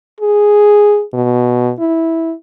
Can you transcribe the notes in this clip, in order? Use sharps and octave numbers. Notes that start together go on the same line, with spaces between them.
G#4
B2
E4